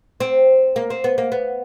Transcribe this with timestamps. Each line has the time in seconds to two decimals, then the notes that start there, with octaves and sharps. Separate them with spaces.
0.20 C4
0.76 A#3
0.90 C4
1.04 B3
1.18 A#3
1.32 B3